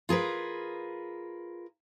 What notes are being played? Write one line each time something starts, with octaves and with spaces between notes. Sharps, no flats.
F4 G#4 A#4 B4